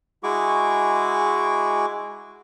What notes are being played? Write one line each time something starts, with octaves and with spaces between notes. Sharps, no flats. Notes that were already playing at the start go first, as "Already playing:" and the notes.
G#3 E4 F#4 G#4 C#6 D6